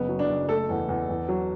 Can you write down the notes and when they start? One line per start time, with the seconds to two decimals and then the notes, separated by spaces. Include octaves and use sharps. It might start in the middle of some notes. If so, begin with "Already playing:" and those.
Already playing: F#1 B3
0.09 F#3
0.19 D4
0.29 F#1
0.49 A3 A4
0.69 E2
0.89 E2
1.09 E2
1.29 F#3